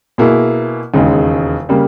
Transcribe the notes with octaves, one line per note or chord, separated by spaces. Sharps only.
B2 A#3 E4 G#4
E1 D#2 C#3 G#3 D#4
C#3 G3 A#3